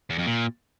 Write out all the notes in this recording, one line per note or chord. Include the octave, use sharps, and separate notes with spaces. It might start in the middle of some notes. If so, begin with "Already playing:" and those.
E2
F2
A#2